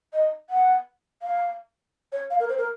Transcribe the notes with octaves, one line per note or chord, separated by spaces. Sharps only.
D#5
F#5
F5
C#5
F5
A#4
C5
A#4